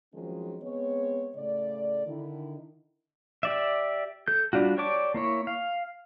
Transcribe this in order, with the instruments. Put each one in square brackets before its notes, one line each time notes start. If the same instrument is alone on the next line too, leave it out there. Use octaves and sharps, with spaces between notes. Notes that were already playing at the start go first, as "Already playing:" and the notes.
[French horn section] D#3 F3 F#3 G#3 C4 C#4
G#3 B3 C4 C#5
A2 C#3 A3 D5
D3 D#3 E4
[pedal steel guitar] G4 D5 E5
A4 G6
G3 D4 F4 F#4
G4 C#5 D5 A5 D6
A#3 E4 C#5
F5